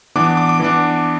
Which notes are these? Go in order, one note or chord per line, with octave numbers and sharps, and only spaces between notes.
E3 B3 D4 D6
D6
D6
E3 B3 D4